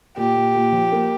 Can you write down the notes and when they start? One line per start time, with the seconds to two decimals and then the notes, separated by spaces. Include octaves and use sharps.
0.17 A#2 G4
0.35 A#2
0.55 A#2
0.72 F3
0.92 A#3